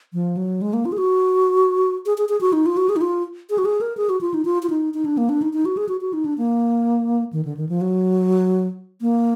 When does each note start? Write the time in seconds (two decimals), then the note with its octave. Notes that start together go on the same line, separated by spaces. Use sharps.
0.13 F3
0.37 F#3
0.62 G#3
0.73 A#3
0.85 F4
0.92 G#4
0.98 F#4
2.06 G#4
2.18 G#4
2.29 G#4
2.41 F#4
2.53 D#4
2.66 F4
2.77 F#4
2.89 G#4
2.96 D#4
3.01 F4
3.50 G#4
3.58 F#4
3.65 G#4
3.81 A#4
3.97 G#4
4.09 F#4
4.21 F4
4.34 D#4
4.45 F4
4.63 F4
4.70 D#4
4.94 D#4
5.05 D4
5.17 A#3
5.29 D4
5.42 D#4
5.53 D#4
5.65 F#4
5.77 G#4
5.89 F#4
6.01 F#4
6.13 D#4
6.25 D4
6.38 A#3
7.33 D#3
7.45 D3
7.57 D#3
7.69 F3
7.81 F#3
9.01 A#3